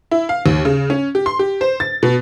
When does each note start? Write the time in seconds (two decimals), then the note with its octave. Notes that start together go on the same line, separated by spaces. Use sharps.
0.11 E4
0.29 F5
0.46 D#2
0.65 C#3
0.90 C#4
1.15 G4
1.26 C6
1.39 G4
1.61 C5
1.80 A6
2.03 B2